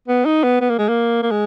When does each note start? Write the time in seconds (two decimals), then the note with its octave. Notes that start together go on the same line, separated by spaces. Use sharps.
0.08 B3
0.25 D#4
0.44 B3
0.61 B3
0.70 A#3
0.79 G#3
0.88 A#3
1.23 A#3
1.31 G#3